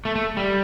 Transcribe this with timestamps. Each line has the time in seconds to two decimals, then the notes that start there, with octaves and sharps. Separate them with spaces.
0.05 A3
0.15 A3
0.37 G3